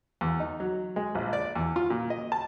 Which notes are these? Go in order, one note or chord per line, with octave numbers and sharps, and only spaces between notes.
E2
D#4
F#3
G#3
A#1
D5
E2
F4
A#2
D#5
A5